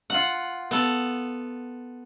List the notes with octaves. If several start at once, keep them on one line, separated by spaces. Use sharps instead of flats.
F4 F#5
B3 A4